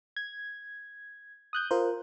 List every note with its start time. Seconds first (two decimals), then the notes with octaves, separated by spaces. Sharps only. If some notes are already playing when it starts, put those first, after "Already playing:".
0.16 G#6
1.53 D#6 F#6 G6
1.71 F4 A#4 C5